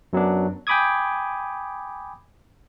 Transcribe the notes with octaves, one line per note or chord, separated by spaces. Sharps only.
F#2 F#3 B3 D4
G5 G#5 B5 D6 D#6 G#6